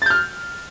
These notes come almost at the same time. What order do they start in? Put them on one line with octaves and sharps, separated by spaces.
A6 G6 F6